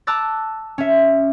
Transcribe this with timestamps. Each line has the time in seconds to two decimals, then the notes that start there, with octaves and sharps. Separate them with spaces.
0.07 A5 A#5 D6 E6 F#6 A6
0.78 C#4 E5